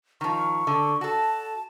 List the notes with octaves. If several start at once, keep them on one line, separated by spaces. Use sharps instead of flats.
D#3 F3 C#6
D3
F#4 A4 A5